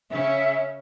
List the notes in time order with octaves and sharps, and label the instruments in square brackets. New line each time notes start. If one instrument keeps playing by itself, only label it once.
[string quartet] C#3 C#4 [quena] E5